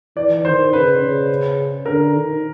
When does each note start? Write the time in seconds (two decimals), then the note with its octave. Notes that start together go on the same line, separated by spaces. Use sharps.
0.16 E3 D5
0.45 D#3 C5
0.73 C#3 B4
1.01 C#3
1.86 D3 A#4
2.14 D#3